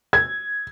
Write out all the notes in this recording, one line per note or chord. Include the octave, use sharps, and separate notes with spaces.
G#6